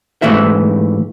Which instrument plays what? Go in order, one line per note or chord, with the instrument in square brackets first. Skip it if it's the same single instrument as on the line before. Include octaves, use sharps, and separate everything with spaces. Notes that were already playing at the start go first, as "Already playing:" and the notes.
[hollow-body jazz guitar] G#2 E3 A3 E4 E5